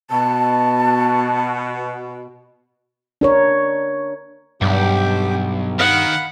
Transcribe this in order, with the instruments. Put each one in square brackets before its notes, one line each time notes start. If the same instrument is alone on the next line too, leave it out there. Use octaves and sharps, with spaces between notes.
[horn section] B2 [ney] A5
[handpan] D4 A#4 C#5
[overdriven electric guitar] B1 [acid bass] G2 [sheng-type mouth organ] G4 G5 D6
[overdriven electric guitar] D#3 [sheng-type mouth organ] F5 B5 [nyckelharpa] F#5